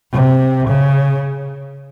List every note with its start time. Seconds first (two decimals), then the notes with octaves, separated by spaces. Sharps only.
0.12 C3
0.68 C#3